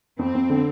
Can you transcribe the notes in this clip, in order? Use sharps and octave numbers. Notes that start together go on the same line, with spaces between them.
F2 C4
F2
D3